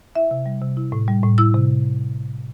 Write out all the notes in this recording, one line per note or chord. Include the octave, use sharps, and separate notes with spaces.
E4 E5
C3
G3
C3
E4
A2
G3
A2
E4 E6
C3